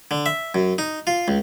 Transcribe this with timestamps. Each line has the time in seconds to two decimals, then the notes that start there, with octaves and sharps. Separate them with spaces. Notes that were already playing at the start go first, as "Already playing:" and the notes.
0.11 D3
0.26 E5
0.55 F#2
0.78 D#4
1.07 F4
1.28 C#2